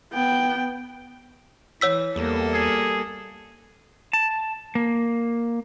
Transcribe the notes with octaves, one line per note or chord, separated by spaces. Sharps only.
B3 G5
E3 C#5 E6 B6
E2 G3 A#3 A4
G#4
A5
A#3